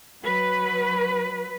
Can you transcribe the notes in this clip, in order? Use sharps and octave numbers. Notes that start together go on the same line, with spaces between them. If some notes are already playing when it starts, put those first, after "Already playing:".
F#3 B4